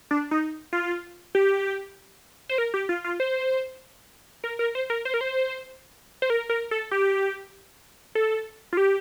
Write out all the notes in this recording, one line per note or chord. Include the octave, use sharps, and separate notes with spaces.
D4
D#4
F4
G4
C5
A#4
G4
F4
F4
C5
A#4
A#4
C5
A#4
C5
A#4
C5
C5
A#4
A#4
A4
G4
A4
F4
G4